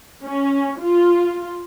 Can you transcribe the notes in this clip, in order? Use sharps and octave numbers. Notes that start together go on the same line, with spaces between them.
C#4
F4